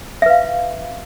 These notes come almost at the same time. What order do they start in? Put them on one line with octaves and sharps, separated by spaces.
E5 B4 F5